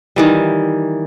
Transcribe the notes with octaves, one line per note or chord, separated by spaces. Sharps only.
D#3 E3 G3